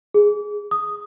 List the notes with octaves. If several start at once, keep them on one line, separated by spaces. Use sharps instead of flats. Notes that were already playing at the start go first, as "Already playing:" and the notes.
G#4
D#6